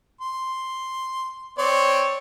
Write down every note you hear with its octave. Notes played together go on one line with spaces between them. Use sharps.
C6
C4 C#5 D5 C6